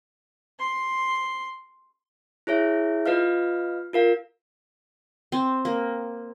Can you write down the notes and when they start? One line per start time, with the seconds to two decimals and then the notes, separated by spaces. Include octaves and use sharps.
0.59 C6
2.47 E4 G#4 C#5 E5
3.06 F4 B4 D#5 F5 F6
3.93 F4 A#4 F5
5.32 C4
5.65 A#3